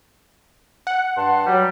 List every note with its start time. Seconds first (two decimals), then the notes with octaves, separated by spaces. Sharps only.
0.87 F#5
1.17 G2 A5 C6
1.46 F#3 G3